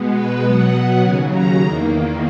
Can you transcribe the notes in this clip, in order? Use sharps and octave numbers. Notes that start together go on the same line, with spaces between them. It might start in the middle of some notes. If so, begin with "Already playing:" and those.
Already playing: B2 G#3 B3
B4
B2 F#3 B3 F#5
D#2 C#3 F#3 G#5
A#5
E2 D#3 A#3